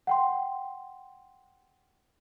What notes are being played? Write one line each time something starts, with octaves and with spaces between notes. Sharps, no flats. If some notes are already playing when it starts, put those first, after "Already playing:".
F#5 G5 C6